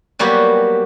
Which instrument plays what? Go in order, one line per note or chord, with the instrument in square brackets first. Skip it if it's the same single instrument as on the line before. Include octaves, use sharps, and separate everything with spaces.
[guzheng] F#3 G3 A#3 B3 F#4 G4